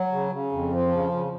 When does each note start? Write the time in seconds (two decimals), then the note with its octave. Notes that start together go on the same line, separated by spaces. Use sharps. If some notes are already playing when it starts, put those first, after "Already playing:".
Already playing: F#3
0.12 C#3
0.32 C#3
0.52 F2
0.72 F3
0.92 C#3
1.12 C#3